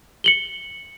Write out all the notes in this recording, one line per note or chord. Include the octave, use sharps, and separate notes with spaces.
C#7 F#7 G7